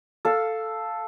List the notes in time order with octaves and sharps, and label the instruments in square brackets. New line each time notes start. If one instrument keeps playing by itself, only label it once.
[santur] A4 F5